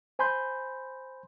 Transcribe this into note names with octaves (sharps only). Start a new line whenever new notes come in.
C5 G#5 B5 C6 G6